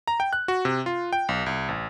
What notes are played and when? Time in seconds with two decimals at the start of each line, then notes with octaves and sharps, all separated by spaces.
0.08 A#5
0.20 G5
0.33 F#6
0.48 F#4
0.65 C3
0.86 F4
1.13 G5
1.29 B1
1.46 C2
1.69 A1